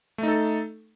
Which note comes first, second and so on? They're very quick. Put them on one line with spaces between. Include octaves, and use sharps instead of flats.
A3 D#4 A4